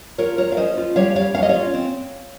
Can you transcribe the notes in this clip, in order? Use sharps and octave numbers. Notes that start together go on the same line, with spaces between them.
F4 A#4 C#5
F4 A#4 C#5
F5
C#4 C5 D#5
F4
G3 C#5 F5
G3 C#5 F5
C#4 F5
D#5
F4 C#5 F5
C4